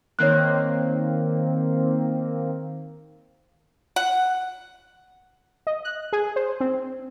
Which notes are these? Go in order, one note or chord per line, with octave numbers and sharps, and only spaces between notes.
D#3 A#3 C4 C#5 F#6
F#5
D#5
F#6
G#4
C5
C4